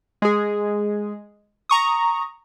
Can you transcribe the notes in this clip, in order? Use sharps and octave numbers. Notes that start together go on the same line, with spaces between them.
G#3 G#4
A#5 C#6 D#6